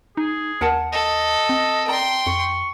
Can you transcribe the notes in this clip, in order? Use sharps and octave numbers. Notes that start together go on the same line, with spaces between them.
D#4 G#4
D#2 A#4 F#5 A5
A4 D#5
C4
D5 G5 A#5 C6
F2 C#6